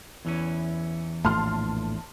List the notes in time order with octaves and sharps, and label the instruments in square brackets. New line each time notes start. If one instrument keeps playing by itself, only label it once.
[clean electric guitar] E2 E3 C#4
[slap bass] A#1 A2 A3 [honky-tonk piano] A5 C6 F6